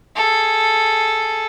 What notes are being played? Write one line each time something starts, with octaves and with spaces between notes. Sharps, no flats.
G#4 A4